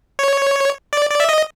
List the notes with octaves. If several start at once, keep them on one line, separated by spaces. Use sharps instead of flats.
C#5
D5
D5
E5
D#5